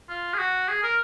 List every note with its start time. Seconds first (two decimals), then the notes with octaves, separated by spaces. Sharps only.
0.09 F4
0.34 G#4
0.39 F#4
0.68 G#4
0.83 A#4